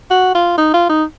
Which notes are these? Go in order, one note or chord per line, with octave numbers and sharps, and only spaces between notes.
F#4
F4
D#4
F4
D#4